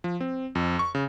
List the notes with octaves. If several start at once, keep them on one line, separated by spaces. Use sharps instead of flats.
F3
C4
F2
C#6
C#3